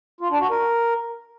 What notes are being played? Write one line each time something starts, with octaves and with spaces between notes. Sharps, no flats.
F4
D4
F#4
A#4